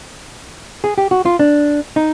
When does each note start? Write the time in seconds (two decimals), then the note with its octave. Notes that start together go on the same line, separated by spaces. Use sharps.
0.84 G#4
0.98 G4
1.11 F#4
1.25 F4
1.39 D4
1.96 D#4